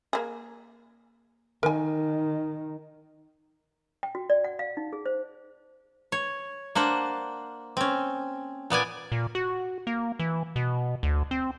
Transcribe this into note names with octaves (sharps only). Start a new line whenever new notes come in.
A#3 G#4
D#3 A#4 G#5
G5
F#4
D5
F#5
F5
D#4
G#4
C5
C#5
A#3 D4 C5 F#5
C4 C#4
A#2 B3 D5 G#5
A#2
F#4
A#3
E3
B2
D2
C4